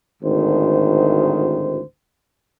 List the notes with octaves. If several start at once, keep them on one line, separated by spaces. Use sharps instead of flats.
G#1 D2 A2 D#3 C5